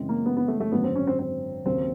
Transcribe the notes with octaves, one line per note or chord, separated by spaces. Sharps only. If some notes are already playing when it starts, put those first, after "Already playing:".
Already playing: F#2 C#3 E3 G#3 C4
A#3
B3
B3
A3
A3
G#1 F#2 D3 F#3 B3
C4
C#4
C4
C4
D#2 C#3 F#3 C4